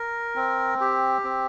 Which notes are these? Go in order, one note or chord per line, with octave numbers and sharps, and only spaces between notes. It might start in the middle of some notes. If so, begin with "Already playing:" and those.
Already playing: A#4
C4
G4
C4